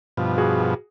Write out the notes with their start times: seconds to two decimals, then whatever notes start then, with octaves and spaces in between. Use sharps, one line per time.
0.17 G2 B2 F3
0.38 F#4 G#4